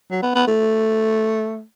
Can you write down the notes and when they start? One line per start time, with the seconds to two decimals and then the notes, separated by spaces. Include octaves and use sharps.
0.11 F#3
0.22 B3
0.35 B3
0.47 A3